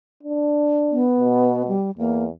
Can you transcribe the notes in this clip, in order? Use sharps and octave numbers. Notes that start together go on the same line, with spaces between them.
D4
B3
B2
G3
E2 A#3